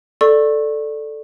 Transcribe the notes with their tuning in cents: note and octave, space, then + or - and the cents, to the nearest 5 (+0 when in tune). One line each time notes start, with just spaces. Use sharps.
A4 +0 D5 +5 C#6 -25